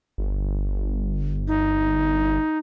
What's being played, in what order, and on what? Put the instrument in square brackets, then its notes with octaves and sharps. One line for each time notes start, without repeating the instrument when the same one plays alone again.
[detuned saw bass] G1
[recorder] D#4